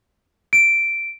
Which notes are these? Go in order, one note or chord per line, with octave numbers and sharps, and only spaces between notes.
D7